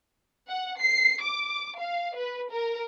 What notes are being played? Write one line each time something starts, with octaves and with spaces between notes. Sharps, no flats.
F#5
C7
D6
F5
B4
A#4